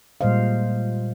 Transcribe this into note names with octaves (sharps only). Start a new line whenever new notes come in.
A#2 G3 G#3 C5 D#5 F5